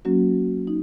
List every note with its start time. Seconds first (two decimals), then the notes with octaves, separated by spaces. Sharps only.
0.05 F#3 A#3 C#4 F#4
0.67 D#4